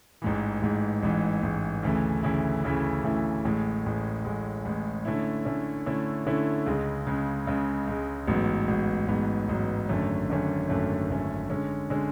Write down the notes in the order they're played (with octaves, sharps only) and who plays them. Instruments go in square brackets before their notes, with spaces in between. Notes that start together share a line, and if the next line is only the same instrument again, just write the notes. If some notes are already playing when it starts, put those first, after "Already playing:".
[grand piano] A1 G#2 E3
A1 G#2 E3
A1 G#2 E3
A1 G#2 E3
D2 C#3 E3 A3 E4
D2 C#3 E3 A3 E4
D2 C#3 E3 A3 E4
D2 C#3 E3 A3 E4
A1 A2 G#3
A1 A2 G#3
A1 A2 G#3
A1 A2 G#3
D3 A3 C#4 E4
D3 A3 C#4 E4
D3 A3 C#4 E4
D3 A3 C#4 E4
C#2 C#3 G#3
C#2 C#3 G#3
C#2 C#3 G#3
C#2 C#3 G#3
A1 G#2 F#3 B3
A1 G#2 F#3 B3
A1 G#2 F#3 B3
A1 G#2 F#3 B3
G#1 F#2 D3 A3 C#4
G#1 F#2 D3 A3 C#4
G#1 F#2 D3 A3 C#4
G#1 F#2 D3 A3 C#4
D3 G#3 C#4
D3 G#3 C#4